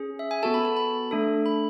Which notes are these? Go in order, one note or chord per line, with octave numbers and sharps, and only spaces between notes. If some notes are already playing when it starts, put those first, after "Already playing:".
Already playing: C#4 G#4
E5
G#5
B3 F#4 A4 A5
B5
A5
B5
A3 D4 A4
B5